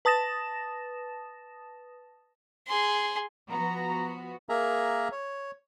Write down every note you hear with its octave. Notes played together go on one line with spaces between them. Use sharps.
B4 A5 D#6 A6 A#6 E7
G#4 C6
F3 B3 F#4 A#5
A#3 G#4 A#4 E5 A#5
C#5